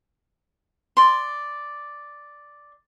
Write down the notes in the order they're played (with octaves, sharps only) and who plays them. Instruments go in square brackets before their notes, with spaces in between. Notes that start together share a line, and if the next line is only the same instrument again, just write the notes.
[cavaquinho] D5 C6